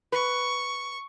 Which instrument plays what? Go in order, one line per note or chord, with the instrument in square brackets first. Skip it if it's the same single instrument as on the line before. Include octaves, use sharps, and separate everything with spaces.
[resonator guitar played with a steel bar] B4 [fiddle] C#6